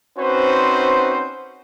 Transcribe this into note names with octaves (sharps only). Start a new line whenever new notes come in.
C4 C#4 D#4 F#4 B4 C5